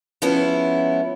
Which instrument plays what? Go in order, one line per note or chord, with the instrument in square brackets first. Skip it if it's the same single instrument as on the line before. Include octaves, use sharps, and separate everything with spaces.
[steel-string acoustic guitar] F3 G#3 B3 C#4 E4